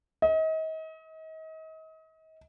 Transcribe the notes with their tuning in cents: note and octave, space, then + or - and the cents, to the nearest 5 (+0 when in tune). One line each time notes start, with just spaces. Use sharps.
D#5 +35